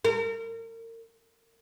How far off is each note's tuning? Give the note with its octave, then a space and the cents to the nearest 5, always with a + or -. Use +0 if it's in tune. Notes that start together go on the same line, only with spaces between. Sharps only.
A#4 -35